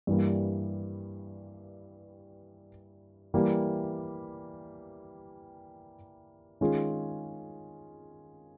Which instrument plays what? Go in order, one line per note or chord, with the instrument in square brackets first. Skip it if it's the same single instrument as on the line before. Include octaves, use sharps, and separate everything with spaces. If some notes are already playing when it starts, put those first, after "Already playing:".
[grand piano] G2 E3 G3 A#3
E3 G3 A#3
D#3 G#3 C#4 F4 G#4